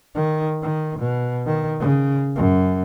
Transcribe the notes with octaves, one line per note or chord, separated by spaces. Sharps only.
D#3
D#3
B2
D#3
C#3
F#2